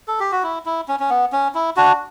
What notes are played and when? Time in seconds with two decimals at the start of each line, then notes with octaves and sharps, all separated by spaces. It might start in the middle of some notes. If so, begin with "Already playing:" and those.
0.08 A4
0.20 G4
0.32 F#4
0.43 E4
0.66 E4
0.88 C#4
1.00 C#4
1.10 B3
1.33 C#4
1.55 E4
1.77 D4 F#4